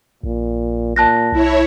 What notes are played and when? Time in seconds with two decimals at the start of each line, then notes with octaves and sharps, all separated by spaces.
0.23 A#1 A#2
0.96 A#2 A5 F#6 A#6
1.32 B1 E4 C#5